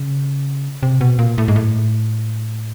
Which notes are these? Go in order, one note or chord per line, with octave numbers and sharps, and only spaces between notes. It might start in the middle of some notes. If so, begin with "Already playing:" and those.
Already playing: C#3
C3
B2
A#2
A2
G#2
A2